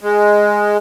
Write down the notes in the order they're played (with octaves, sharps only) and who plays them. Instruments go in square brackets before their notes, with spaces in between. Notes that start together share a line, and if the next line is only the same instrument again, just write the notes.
[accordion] G#3